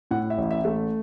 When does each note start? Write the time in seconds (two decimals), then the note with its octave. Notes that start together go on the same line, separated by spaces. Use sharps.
0.11 A2 F#5
0.30 E5
0.38 A1
0.51 E5
0.65 A3